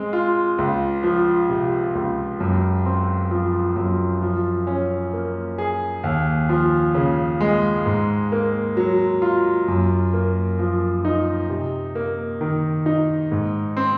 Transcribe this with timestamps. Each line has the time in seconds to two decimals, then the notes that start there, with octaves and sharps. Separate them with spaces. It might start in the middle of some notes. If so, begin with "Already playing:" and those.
Already playing: G#3 C4
0.13 F4
0.58 C#2
1.03 F3
1.49 C3
1.95 C#2
2.40 F#2
2.86 C4
3.31 F3
3.76 F#2
4.22 F3
4.67 C#4
5.13 A#3
5.58 G#4
6.04 D#2
6.49 F3
6.95 C#3
7.40 G#3
7.86 G#2
8.32 A#3
8.77 F#3
9.22 F4
9.68 F#2
10.13 A#3
10.59 F3
11.05 D#4
11.50 C3
11.95 A#3
12.41 D#3
12.86 D#4
13.32 G#2
13.77 C4